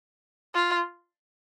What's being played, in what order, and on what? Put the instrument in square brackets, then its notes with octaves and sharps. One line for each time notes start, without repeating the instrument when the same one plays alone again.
[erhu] F4